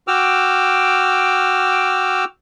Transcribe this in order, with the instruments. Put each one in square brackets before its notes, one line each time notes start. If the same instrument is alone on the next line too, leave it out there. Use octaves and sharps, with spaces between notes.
[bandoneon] F#4 G5 D6 E6 F6